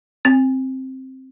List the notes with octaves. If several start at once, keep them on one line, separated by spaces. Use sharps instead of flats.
C4